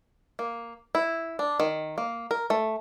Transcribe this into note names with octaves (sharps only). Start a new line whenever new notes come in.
A#3
E4
D4
D#3
A#3
A#4
A3